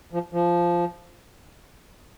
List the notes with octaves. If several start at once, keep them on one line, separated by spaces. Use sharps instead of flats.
F3
F3